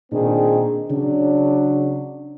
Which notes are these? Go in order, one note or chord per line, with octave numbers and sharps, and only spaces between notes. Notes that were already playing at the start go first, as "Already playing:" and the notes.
A#2 D#3 C4 D4 G#4
C#3 F#3 D4